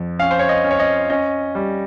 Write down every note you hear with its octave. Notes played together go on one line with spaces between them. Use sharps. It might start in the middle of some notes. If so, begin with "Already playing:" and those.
Already playing: F2
C#4 F5
C5
C#5
D#5
C#4
C#5
D#5
C#4 D#5
G3